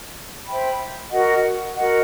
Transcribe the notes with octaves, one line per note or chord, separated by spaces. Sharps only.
C5 E5 G5 B5
F#4 A#4 D#5 F#5
F#4 A#4 D#5 F#5